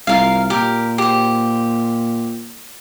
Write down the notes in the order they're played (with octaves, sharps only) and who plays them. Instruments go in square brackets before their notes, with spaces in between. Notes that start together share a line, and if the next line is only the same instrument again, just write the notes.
[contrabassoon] C2 [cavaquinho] F4 A#4 F5
[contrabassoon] A#2 [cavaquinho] G4 A#4
[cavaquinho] G4 C5